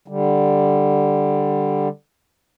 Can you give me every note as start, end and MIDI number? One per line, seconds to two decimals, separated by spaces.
0.08 1.88 50
0.08 1.88 55